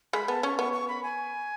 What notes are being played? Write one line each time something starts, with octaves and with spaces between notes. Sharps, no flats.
G#3 B5
B3 A5
C#4 C#6
B3 C#6
C#6
B5
G#5